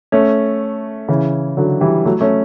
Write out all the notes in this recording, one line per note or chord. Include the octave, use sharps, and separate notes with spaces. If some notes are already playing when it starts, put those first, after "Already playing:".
A3 C#4
C#3 E3
D3 F#3
E3 G3
F#3 A3
A3 C#4